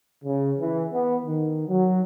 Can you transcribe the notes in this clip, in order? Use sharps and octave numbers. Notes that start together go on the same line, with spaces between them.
C#3
E3
B3
D#3
F#3